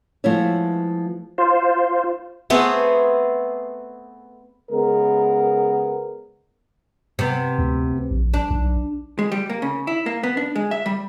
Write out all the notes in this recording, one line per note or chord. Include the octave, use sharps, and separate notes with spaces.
F3 G#3 A3 B3 E4 C#5
F4 C5
A3 B3 C4 G#4
C#3 G#3 B3 A#4
C3 B3
D2
A#1
D4
B1
G#3
G3
A#3
C#3
E4
A#3
B3
D4
G#3
E5
G3